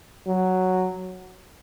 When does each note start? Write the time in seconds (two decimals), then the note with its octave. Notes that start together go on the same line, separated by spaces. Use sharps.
0.27 F#3